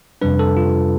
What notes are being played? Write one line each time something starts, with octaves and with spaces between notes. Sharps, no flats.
F2 C3 G3 D4 B4
A4
F4